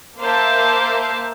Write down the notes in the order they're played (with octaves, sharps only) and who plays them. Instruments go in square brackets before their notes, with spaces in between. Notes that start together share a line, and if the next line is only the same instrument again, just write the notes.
[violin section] A#3 C5 E5 F5 A5